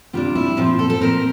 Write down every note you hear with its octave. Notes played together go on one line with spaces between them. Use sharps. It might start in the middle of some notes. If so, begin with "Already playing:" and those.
C3 G3 D4 F4
E4
A#2 F3 C4 F4
A4
A4
A#2 F3 C4 A#4